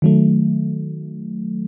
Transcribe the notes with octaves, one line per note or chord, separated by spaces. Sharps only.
D#3 F#3 A3